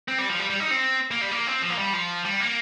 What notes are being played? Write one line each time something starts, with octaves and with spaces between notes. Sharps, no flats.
C4
G3
F3
G3
G3
D#4
C4
A#3
G3
A#3
C4
F3
A#3
G3
F3
G3
A#3